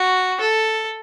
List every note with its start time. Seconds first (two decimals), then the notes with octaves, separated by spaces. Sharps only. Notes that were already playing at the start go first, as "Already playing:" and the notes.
Already playing: F#4
0.41 A4